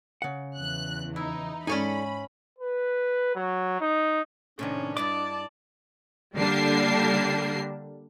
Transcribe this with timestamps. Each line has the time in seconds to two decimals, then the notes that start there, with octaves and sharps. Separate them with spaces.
0.22 C#3 F#5
0.58 E2 E3 F#6
1.16 D#4 E4
1.67 G#2 C#4 D#4 A4 C#5 D5 G#5 B5
2.59 B4
3.35 F#3
3.81 D#4
4.59 A2 C3 D#3 C#4 D4
4.97 G2 E4 D5 D#5 A5 D6
6.35 D3 G3 A#3 D4 C7